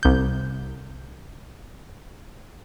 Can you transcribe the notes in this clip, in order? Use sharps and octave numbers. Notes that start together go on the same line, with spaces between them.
C2 G6